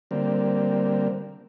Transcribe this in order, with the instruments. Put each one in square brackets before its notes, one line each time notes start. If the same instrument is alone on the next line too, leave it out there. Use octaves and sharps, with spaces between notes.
[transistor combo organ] D3 G3 A#3 C4